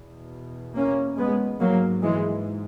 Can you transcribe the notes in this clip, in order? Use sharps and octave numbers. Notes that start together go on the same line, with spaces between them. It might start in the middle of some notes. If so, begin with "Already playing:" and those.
Already playing: E2 B2
A#3 C#4
G#3 B3
G#2 F#3 A#3
E3 G#3